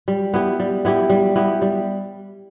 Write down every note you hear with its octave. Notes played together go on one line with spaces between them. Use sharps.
G3
B3 E4 G4
G3
B3 E4 G4
G3
B3 E4 G4
G3